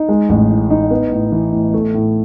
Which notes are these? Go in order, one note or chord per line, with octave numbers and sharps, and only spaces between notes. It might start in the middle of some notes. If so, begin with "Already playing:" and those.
Already playing: D#4
G#3
A1
A2
D#4
B3
A2
E3
A2
A3
A2